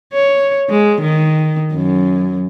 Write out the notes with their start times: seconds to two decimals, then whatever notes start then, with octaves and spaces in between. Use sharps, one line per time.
0.14 C#5
0.70 G#3
1.02 D#3
1.74 F#2